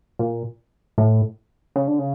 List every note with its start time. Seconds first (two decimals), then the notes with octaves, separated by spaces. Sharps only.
0.19 A#2
0.98 A2
1.76 C#3
1.88 D3
1.99 C#3